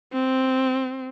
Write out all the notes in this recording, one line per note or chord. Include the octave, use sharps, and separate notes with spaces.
C4